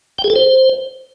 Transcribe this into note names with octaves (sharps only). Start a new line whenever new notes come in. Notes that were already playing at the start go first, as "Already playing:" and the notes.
G5
G#4
A4
C5